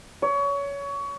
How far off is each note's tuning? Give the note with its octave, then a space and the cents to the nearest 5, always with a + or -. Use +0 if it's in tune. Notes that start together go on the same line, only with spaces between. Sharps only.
C#5 +25